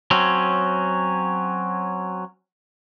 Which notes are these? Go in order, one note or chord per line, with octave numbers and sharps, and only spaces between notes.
F#3 C4 C#4